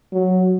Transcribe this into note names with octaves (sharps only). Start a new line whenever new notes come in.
F#3